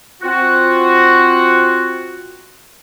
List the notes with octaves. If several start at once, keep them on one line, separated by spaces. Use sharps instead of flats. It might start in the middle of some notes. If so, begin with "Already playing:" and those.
C4 F4 F#4